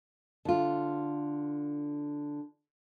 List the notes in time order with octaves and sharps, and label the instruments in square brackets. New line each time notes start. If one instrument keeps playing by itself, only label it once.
[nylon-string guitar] D3 F4